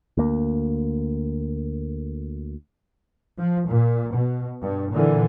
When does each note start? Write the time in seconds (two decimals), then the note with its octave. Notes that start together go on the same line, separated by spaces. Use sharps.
0.17 D2 A#3
3.38 F3
3.68 A#2
4.13 B2
4.62 G2
4.93 A#2 D3 E3